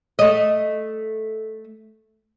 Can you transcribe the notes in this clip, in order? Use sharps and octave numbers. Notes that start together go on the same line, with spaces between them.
A3 D#5